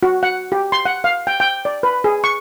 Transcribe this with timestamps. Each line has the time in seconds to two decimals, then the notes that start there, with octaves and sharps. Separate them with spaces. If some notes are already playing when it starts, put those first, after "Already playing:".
0.03 F#4
0.23 F#5
0.52 G4
0.72 C6
0.86 F#5
1.04 F5
1.27 G5
1.40 G5
1.65 D5
1.83 B4
2.04 G#4
2.24 C#6